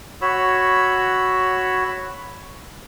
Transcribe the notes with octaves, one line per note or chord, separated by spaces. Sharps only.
F#4 C#5 B5 E6